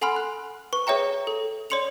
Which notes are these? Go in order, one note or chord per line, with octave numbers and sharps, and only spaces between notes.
A4 F#5 G#5 B5 C6 F6
F#6
B4 C#6
G#4 C#5 E5 G5 A#5
A4
C#5 D5 C6 C#7 F7